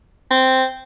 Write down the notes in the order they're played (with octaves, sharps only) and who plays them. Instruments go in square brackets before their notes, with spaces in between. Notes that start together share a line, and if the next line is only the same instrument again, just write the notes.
[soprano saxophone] C4